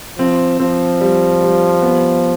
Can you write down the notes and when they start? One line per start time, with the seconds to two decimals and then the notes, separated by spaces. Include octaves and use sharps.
0.19 F3 C4
0.60 F3 C4
1.01 G3
1.42 G3
1.82 B3